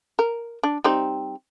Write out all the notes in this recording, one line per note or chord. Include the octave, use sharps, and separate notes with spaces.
A#4
D4
G3 C4 D#4